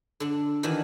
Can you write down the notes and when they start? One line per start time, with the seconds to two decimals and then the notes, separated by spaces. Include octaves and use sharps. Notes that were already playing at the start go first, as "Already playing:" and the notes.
0.20 D3 D4
0.63 D#3 E3 D4 F#4